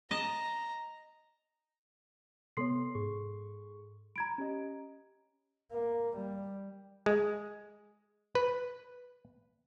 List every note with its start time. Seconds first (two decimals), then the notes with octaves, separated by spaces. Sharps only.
0.11 D#5 A5 A#5
2.57 C3 B3 A4 C#5 C6 C7
2.95 G#2 G#4 C#6
4.16 A#5 B5 G#6 D7
4.38 C#4 G4 D#5
5.72 A#3
6.16 G3
7.06 G#3
8.35 B4